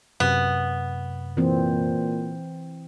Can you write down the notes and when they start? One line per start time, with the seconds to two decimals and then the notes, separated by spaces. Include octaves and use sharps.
0.20 F#2 C3 B3
1.37 A#2 E3 C4